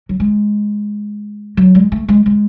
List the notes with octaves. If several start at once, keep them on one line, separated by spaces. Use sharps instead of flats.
F#3
G#3
F#3
G#3
A3
G#3
G#3